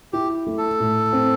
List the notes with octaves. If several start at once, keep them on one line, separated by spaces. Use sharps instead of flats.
E4 G4
A3
A4
A2
C4